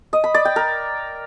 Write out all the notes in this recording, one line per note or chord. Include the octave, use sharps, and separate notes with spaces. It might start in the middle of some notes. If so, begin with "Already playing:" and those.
D#5
B5
D5
G5
A#4